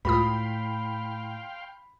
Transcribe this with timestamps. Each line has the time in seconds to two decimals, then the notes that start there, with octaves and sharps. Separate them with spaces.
0.05 C#2 A2 F4 F5 G5 B5 C6 D#6